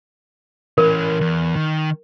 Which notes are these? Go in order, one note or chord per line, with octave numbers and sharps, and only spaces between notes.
E3 C#4 A#4
E2
D#3